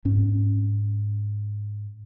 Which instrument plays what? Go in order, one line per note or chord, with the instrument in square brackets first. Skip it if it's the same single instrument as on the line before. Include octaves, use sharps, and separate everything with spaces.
[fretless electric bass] G#2 C#4